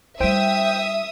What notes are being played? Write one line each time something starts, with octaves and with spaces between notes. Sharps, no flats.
G3 E4 C5 E5 G5 D#6 G6